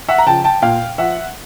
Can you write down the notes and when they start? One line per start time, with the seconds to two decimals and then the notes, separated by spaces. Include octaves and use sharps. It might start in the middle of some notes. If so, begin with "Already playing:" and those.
0.08 E5 F#5
0.18 A#5
0.26 C#3 F3 G5 A5
0.45 G5 A5
0.62 A#2 F5 G5
0.98 F3 E5 F#5